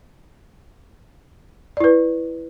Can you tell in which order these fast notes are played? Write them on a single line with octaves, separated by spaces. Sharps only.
D5 E4 B4